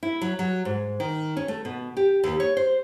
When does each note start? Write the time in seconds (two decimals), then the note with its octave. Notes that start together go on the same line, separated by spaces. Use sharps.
0.03 E4
0.21 F#3
0.39 F#3
0.65 G#2
1.00 D#3
1.37 C#4
1.48 A3
1.65 B2
1.97 G4
2.23 D#2
2.40 C#5
2.57 C5